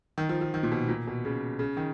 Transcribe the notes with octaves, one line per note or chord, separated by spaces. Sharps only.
D#3
F3
F3
D#3
A#2
B2
A#2
B2
C#3
C#3
D#3